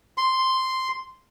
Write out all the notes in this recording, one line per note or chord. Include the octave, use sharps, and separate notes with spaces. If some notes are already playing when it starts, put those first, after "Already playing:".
C6